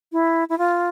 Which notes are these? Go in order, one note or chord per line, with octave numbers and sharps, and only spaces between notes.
E4
E4
F4